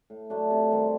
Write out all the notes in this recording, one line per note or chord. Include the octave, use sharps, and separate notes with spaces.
A2
F#3 A3 D4
C3
D#3 G3 C4